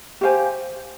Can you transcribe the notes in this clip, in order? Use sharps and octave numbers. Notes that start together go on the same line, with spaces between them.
G4 C5 F5 G#5